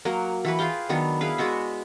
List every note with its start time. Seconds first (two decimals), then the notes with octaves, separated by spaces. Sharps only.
0.05 F#3 A#3 A#4
0.45 E3 F#4 B4
0.59 F4 G#4 F5 G5
0.89 D#3 F#3 B3 D4
1.21 E4 G#4 B4 F5
1.38 G#3 B3 F#4 E5